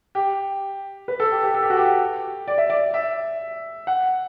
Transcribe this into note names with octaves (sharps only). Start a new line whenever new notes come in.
G4
B4
A4
G4
G4
A4
G4
F#4
G4
D5
E5
D5
E5
F#5